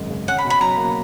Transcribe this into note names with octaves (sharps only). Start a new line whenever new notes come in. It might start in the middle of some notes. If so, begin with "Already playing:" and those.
Already playing: G#1 F#2 G#3
C#3
C#4 F#5
B5
B2
B5
F#3 A#5
A#3